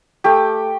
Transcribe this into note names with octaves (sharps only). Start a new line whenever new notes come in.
A3 G4